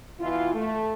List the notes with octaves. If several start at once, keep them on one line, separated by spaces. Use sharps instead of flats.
B2 E3 E4 F4
A3